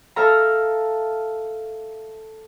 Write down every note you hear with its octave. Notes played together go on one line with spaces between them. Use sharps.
A4 E5 F5 A#5